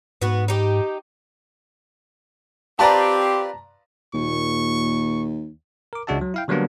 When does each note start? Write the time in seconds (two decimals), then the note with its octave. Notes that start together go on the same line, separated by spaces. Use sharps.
0.22 G#2 B3 F#4
0.48 D#4 G4
2.79 C4 F4 G4 B4 D5 A5 A#5
4.14 D#2 A#2 C#6
5.93 A#4 D6
6.07 C#2 G#3 D4 F#4 E5 A5
6.21 F#3
6.34 E4 F5 G5
6.48 D3 F#3 G3 A#3 B3 D4